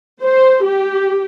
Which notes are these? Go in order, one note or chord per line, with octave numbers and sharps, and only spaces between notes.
C5
G4